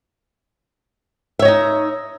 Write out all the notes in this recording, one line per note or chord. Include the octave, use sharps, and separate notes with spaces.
D#4 C#5 D#5 E5